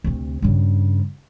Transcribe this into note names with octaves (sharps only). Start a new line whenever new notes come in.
D2 C3
G2 C#3